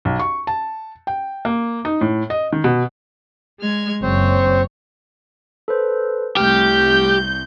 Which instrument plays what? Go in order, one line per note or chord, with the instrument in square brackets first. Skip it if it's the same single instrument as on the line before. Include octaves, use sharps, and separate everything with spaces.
[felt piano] B1
C#6
A5
G5
A#3
D#4
A2
D#5
D#3
B2
[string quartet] G#3 F6 G#6
[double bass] F#1 [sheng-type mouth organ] C4 C5 [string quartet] C#5
[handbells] A4 B4 C5
[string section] C2 G6 [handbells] A3 F6 [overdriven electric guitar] G4